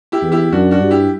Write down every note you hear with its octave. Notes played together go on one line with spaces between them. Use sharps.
E4 G4
E2
E4 G4
F#2 D4 F#4
D4 F#4
G2
E4 G4